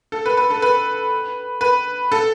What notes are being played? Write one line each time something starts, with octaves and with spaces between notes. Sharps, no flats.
A4
B4
B4
A4
B4
B4
A4